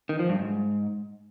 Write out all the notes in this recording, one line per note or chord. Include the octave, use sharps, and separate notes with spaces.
D#3
F3
G2
G#2